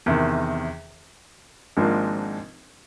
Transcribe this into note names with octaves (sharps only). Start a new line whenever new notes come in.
E2 C3 D#3
G#1 G#2 F3 A#3 D4